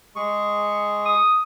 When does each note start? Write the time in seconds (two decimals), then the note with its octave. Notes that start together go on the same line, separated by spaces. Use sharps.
0.16 G#3 G#4 C#6
1.05 D#6